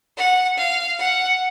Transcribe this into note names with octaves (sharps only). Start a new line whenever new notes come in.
F#5
F5
F#5